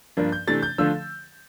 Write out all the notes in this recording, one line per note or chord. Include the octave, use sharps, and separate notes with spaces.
G2 F3 A#3 D4
G6
C3 E3 A3 D4 A6
G6
D3 F3 A3 D4 F4 E6